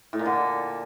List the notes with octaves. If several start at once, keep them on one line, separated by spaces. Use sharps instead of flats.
A2
A#2
D3